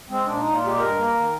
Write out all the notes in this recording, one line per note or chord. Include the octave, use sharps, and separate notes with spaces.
G#3 C4
A#2 D4
A#2 D#4
F4
G#3 G4
G2 A#4
A#3
D#3